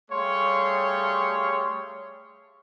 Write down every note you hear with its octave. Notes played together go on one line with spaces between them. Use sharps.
G3 A3 G#4 C#5 F5 C6